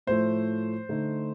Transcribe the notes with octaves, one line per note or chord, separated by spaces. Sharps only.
A2 F3 A3 C5
D3 A3 D#4